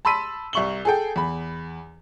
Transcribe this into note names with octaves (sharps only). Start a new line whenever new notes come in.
A5 B5 C6 E6 B6 D#7
C2 E5 C#6 F#7 G7
G#4 A4 G5
E2 B5